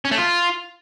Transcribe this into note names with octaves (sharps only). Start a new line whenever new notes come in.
C#4
A3
F4